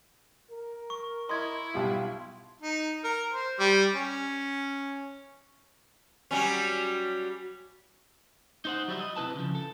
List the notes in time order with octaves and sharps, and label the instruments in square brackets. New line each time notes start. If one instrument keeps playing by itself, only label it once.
[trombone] A#4
[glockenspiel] C#6
[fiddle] E4 [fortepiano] D#5 [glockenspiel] C6 G#6
[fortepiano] B1 G3 F4
[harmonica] D#4
A#4
C5
G3
C#4
[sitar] F#3 G3 C#4
[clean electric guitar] D#4 C5 F#5
F#3 G3 E4
D#5
C3 E4 B4 A5
C#3 F3
A4